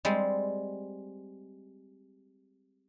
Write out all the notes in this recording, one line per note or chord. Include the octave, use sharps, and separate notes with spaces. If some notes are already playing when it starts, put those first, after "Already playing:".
G3 G#3 C4